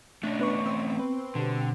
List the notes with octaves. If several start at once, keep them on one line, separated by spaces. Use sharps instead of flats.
A3 C#4 D4 D#5
B3 B4 C#6
C4
B4
B2 D3 G3